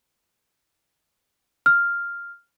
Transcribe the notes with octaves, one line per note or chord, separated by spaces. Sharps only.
F6